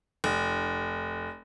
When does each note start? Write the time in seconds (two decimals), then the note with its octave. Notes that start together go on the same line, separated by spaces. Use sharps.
0.24 F1